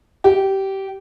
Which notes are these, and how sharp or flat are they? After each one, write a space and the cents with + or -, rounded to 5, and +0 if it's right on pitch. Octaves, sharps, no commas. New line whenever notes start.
G4 -20